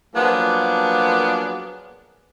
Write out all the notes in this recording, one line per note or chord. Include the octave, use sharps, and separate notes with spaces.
F3 F#3 A#3 B3 D4 G#4